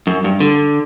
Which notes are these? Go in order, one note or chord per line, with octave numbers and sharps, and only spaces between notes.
F#2
G2
D3